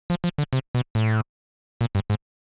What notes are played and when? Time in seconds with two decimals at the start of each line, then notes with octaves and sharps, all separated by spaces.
0.10 F3
0.24 F3
0.38 D3
0.53 C3
0.75 B2
0.95 A2
1.81 A#2
1.95 G2
2.10 G#2